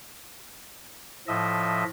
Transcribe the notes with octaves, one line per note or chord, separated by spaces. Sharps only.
A2 F3 D#5 E5